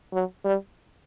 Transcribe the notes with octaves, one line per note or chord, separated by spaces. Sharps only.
F#3
G3